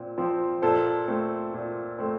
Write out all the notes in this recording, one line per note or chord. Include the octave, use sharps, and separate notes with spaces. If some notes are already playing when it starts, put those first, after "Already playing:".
Already playing: A#2 C4
F3 C4
A#2 A4 C5
A3 C4
A#2
A3 C4